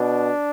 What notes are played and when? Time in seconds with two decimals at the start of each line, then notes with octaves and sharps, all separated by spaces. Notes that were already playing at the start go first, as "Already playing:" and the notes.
Already playing: B2 D4